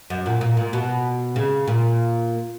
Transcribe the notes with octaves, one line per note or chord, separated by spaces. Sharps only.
F#2
A#2
A#2
A#2
B2
C#3
A#2